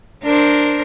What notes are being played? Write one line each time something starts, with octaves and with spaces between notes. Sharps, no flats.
D4 A#4 C5